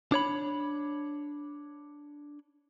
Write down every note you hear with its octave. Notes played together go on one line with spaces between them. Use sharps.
D4 C#5 B5